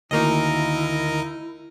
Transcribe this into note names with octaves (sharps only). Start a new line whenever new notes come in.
D2 D#3 A#3 D#4 E4 A#4 D#5